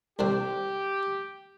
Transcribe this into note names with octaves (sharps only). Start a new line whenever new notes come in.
C2 D3 C4 G4